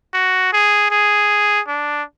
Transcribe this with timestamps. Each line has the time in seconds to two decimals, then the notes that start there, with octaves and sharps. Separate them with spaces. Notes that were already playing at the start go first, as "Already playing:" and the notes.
0.14 F#4
0.53 G#4
0.91 G#4
1.68 D4